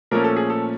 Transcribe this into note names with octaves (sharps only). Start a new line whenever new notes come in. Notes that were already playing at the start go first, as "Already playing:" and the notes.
A#2 F3 A3 C#4 A#4
A4
G#4
A4